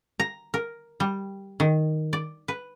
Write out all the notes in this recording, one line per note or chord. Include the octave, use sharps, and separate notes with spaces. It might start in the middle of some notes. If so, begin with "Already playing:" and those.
A#5
A#4
G3
D#3
D5
B4